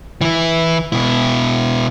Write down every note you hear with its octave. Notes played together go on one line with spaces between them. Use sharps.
E3 E4
B2 E4